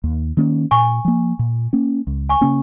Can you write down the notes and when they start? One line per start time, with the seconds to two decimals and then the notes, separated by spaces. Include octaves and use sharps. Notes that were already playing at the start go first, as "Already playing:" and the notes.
0.04 D#2
0.37 D#3 A#3 C#4
0.71 A#2 G#5 C#6
1.05 F3 A#3
1.39 A#2
1.73 A#3 C#4
2.07 C#2
2.29 G#5 C#6
2.41 C#3 A#3 C#4